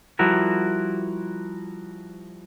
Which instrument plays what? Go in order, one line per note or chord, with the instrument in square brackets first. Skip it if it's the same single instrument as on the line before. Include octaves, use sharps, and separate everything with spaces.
[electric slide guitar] F3 G3 E4 F#4 A#4